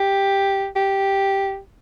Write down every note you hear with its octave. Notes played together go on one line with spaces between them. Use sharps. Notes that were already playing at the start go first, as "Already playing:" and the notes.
Already playing: G4
G4